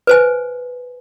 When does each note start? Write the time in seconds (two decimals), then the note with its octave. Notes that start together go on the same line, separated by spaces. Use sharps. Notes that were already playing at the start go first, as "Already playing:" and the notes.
0.07 B4 C5 G#5